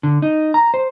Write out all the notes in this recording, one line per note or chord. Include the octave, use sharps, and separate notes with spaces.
D3
D#4
A#5
C5